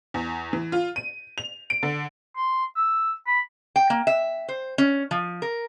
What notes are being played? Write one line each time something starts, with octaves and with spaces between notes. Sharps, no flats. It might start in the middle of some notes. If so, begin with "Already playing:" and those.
E2
E3
F4
D#7
F7
D7
D3
C6
E6
B5
G5
A#3
E5
C5
C#4
F3
A#4